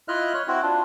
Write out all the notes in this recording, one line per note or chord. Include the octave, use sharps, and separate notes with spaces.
E4 F4 D#5 E5 F6 F#6
C#5 F#6
C4 E4 F#4
D4 F4